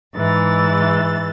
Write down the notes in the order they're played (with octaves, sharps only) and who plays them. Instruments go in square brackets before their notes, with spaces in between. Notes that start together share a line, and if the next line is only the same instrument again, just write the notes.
[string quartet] G#2 E3 A6